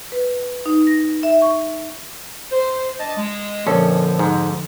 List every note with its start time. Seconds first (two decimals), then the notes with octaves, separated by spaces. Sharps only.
0.12 B4
0.66 D#4
0.87 A#6
1.23 E5
1.42 C#6
2.52 C5
2.99 D4 D#5 A5
3.17 G#3
3.67 A#1 F2 D3 F3 C#4 A4
4.19 G#2